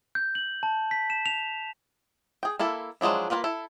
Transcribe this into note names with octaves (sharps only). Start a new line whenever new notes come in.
G6
F#7
A5
B6
E7
F7
G#4 G5
A#3 E4 A4 B5
F3 F#3 G#3 D4 E4
A#3 C4 F4 A#4 B4
E4 A4